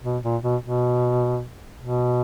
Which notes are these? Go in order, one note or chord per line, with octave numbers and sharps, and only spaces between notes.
B2
A#2
B2
B2
B2